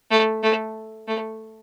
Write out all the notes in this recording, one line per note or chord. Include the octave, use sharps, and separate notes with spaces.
A3
A3
A3